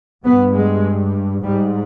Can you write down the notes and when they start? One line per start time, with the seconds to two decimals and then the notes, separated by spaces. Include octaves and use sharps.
0.25 G2 B3
0.55 G#3
1.43 G#2 G3